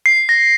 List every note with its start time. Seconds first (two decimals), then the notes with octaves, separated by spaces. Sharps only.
0.06 C7
0.29 A#6